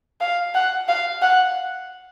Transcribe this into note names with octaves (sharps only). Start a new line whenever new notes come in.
F5
F#5
F5
F#5